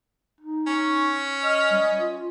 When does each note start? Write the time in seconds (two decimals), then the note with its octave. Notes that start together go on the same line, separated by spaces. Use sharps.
0.41 D#4
0.67 C#4 C#6
1.43 D#5 F6
1.71 G3
1.98 F4